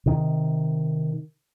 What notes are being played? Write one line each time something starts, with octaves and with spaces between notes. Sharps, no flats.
C3 D#3